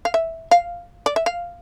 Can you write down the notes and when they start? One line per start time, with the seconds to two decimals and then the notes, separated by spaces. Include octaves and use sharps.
0.05 F5
0.14 E5
0.51 F5
1.06 D5
1.16 E5
1.26 F5